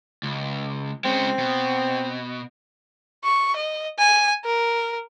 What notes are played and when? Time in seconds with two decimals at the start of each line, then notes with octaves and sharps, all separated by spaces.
0.23 C#2
1.05 G#3 C4 C#4
1.39 B2
3.24 C#6
3.56 D#5
3.99 G#5
4.45 A#4